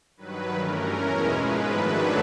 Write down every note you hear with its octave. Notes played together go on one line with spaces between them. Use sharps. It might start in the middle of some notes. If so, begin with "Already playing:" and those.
G2 D#3 F#3 B4
G2 E3 A3 C#4 A#4
E2 B2 G#3 C#4 E4
G#2 F3 G#3 B4
F#2 D#3 F#3 A3 D4 B4